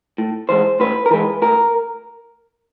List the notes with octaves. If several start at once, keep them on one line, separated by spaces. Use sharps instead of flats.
A2
E3 G#3 C5
A2 B4
A#4
E3 G#3 B4
A2 A#4